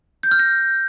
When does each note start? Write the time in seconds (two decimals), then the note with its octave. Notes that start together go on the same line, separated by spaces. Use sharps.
0.23 G6
0.31 F6
0.39 A#6